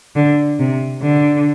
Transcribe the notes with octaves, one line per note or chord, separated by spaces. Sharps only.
D3
C3
D3